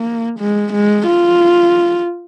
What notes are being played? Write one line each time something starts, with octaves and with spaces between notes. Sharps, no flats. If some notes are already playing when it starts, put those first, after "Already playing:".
Already playing: A#3
G#3
G#3
F4